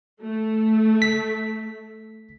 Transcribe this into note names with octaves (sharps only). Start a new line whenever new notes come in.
A3
B6